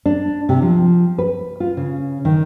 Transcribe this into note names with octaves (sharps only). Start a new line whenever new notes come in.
D4
C3
F3
B4
F4
C#3
D#3